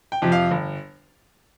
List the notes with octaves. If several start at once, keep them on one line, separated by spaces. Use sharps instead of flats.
G5
F2 C3 F3
F5
G1